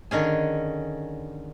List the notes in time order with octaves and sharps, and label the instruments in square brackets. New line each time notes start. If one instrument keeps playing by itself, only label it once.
[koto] D3 D#3 C#4 G#4